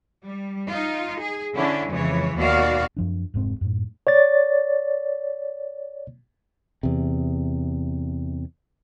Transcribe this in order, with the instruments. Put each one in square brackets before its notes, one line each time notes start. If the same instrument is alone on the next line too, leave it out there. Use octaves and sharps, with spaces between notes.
[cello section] G3
D#4 F4
G#4
D3 C#4 D4 E4
F2 C#3 E3 G#3 C#5
D#2 B2 F#4 D5 F5
[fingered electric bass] F#2 F3 D4
F1 G#2 G#3 C4
F#2 A2
[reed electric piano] C#5 D5 A6
[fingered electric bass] E2 C3